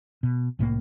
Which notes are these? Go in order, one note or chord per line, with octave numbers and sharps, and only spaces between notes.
B2
C2 A2 F3 A#3